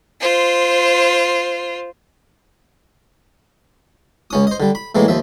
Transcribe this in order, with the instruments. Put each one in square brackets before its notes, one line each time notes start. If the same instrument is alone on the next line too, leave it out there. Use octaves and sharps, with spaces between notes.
[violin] F4 C5
[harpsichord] C#2 C#4 D#6
C5 D#5
D3 G3
B5
A2 E3 G#3 A#3
D#2 F3 E5